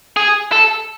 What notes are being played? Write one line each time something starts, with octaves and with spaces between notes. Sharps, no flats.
G#4
A4